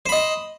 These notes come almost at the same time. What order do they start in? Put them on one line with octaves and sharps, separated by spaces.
C5 B5 D#5